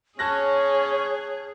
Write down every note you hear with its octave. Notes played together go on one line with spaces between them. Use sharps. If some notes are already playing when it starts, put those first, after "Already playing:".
C#4 G#4 C#5 A5 F#6 A#6